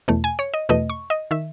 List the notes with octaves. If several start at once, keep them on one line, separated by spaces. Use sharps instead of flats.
E2 B2 A3
G#5
C#5
D#5
E2 B2 A3 D#5
C#6
D#5
D#3 E5